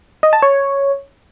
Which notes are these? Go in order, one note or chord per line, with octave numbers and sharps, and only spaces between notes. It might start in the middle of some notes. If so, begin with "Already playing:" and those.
D#5
A5
C#5